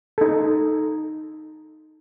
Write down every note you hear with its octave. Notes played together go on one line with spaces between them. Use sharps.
D#4 A4